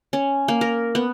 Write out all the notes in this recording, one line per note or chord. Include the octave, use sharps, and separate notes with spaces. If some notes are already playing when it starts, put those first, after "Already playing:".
C#4
A#3
A#4
B3